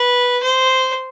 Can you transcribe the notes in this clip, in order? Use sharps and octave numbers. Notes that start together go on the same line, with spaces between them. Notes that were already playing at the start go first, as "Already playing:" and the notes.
Already playing: B4
C5